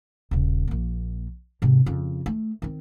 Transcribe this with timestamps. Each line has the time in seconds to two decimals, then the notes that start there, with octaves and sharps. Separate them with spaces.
0.31 D#1 C#3
0.67 A#1 A#3
1.62 G#2 C3
1.86 F2 C#3
2.26 A3
2.62 D#3 C4